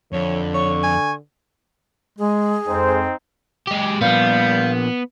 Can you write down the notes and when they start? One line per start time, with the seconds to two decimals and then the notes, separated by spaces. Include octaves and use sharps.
0.13 F2 D3 C#5
0.54 C#5 C#6
0.83 G#5
2.18 G#3 G#4
2.68 F2 G#3 C4 D#4 C5 G5
3.67 G#3 G4
4.01 A#2 F3 G3 B3 F5